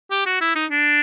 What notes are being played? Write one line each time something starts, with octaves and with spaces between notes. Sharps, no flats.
G4
F#4
E4
D#4
D4